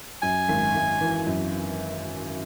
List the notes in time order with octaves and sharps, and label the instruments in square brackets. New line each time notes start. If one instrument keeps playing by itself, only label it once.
[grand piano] F#2 [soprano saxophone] G#5
[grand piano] G#1
G#1
E3
F#2